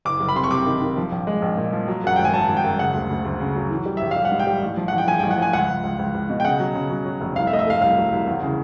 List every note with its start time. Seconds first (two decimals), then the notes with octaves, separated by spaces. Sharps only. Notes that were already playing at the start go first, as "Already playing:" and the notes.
0.05 F#1 D6
0.20 F#1
0.28 B5
0.36 C3 C6
0.44 C#6
0.51 C3 D6
0.66 D#3
0.81 D#3
0.97 F3
1.12 A#1
1.27 G#3
1.42 A#1
1.57 A#2
1.73 F3
1.88 F#3
2.04 F#2 F#5
2.16 G#1 G5
2.25 G#5
2.33 F#3 A5
2.49 G#1
2.57 G5
2.64 F#2
2.79 C#3 F#5
2.94 D2
3.10 D2
3.25 D2
3.40 C#3
3.56 F#3
3.71 E3
3.86 G3
3.97 A#1 E5
4.11 F5
4.16 G3
4.25 F#5
4.32 G#2
4.39 G5
4.47 G3
4.62 A1
4.77 F3
4.88 A1 F#5
4.98 G5
5.07 F3 G#5
5.19 G5
5.23 A1
5.31 F#5
5.38 F3 G#5
5.53 C#2 F#5
5.68 C#2
5.84 C#2
5.99 C#2
6.14 C#2
6.30 B2
6.40 G5
6.45 C#3 F#5
6.60 F#3
6.75 C#3
6.90 F#3
7.06 F#3
7.21 F1
7.36 C2 F5
7.47 E5
7.51 A3 D#5
7.59 E5
7.67 A3 F5
7.82 C2 F5
7.97 F#3
8.12 C2
8.27 E2
8.42 C#3